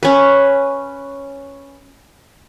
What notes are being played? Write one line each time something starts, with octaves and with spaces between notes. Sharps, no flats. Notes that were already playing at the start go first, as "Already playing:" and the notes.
C#4 B4